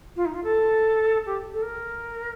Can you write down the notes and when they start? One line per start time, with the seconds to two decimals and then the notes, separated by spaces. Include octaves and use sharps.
0.16 F4
0.26 D#4
0.34 F4
0.44 A4
1.26 G4
1.53 A4
1.62 A#4